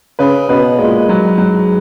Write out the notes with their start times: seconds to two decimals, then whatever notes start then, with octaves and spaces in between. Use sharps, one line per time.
0.19 C#3 B4
0.49 B2 B4
0.79 A#2 G#3
1.08 G#2 F#3
1.38 F#3